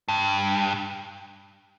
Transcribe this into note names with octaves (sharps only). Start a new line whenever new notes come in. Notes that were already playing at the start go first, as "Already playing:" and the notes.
G2